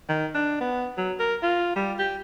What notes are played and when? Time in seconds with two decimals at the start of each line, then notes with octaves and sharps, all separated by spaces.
0.09 D#3
0.35 D4
0.61 B3
0.98 F#3
1.20 A#4
1.43 F4
1.76 G3
1.99 G4